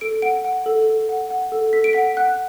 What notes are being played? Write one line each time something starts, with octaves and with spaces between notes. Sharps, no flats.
A4 D7
F#5 D7
F#5
A4
A4
F#5
F#5
A4
A4 B6
D7
F#5 B6
F#5 F#6